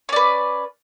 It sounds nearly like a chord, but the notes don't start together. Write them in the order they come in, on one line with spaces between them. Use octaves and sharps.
C#4 D5 B4